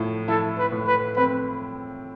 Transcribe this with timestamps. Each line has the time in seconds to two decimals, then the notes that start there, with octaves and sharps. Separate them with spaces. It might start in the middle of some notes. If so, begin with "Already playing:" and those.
Already playing: A2 F3
0.28 E4 A4
0.58 B4
0.72 A2
0.87 B4
1.16 C4 B4